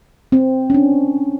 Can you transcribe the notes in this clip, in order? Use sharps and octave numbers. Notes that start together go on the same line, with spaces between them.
C4
C#4
D4